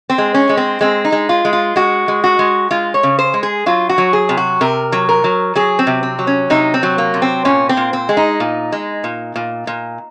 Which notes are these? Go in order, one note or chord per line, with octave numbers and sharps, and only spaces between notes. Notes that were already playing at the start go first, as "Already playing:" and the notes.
C4
G#3
C#4
G#3
C4
G#3 C4
D#4
G#3
F4
G#3
F4
G#3 F#4
G#3
F#4
G#3
G#3 F4
C#5
C#3
C5
G#3
G#4
F#3 F4
F#4
F#3
G#4
C3
F#4
C3 A#4
F#3
A#4
F#3
F#3 G#4
C4
C3
C4
F#3
C#4
C3 D#4
C4
F#3
A#3
C3
C4
A#2 C#4
C4
A#2
C4
G#3
D#4
A#2
G#3
A#2
A#2
A#2